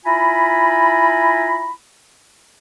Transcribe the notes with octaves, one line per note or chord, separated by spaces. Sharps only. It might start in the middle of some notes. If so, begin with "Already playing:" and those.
E4 F4 G#5 A#5 B5